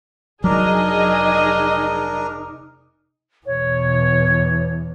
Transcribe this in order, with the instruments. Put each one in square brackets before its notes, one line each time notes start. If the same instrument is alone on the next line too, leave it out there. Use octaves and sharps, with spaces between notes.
[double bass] F1 D#4 [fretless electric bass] F#3 [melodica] D4 A#4 [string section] G#4 D#5
[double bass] E2 B2 [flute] C#5